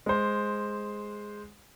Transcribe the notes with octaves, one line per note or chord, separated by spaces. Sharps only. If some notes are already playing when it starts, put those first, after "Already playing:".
G#3 C5